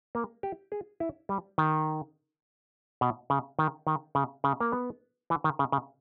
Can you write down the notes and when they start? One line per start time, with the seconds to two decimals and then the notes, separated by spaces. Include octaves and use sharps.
0.15 A#3
0.43 G4
0.72 G#4
1.00 E4
1.29 G3
1.58 D#3
3.01 B2
3.30 C#3
3.59 D#3
3.87 D#3
4.15 C#3
4.44 C#3
4.60 A#3
4.72 B3
5.30 E3
5.44 D#3
5.59 C#3
5.72 C#3